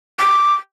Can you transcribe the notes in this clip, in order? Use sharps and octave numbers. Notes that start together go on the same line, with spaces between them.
D6